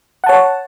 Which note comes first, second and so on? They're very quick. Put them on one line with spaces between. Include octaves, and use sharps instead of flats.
F#5 A5 C#5